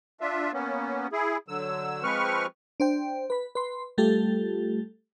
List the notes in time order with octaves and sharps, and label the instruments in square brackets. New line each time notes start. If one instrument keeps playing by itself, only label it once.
[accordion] D4 F4 E5
A#3 B3 C#4
E4 G#4
D3 F#3 E6
F3 G#3 C4 B4 C#6 F6
[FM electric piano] D4 C5 G5
B4 B5
B4 C6
G3 A3 F4 G4 A4